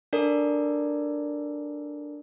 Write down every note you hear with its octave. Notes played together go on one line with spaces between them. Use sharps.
D4 A4 A#4 D5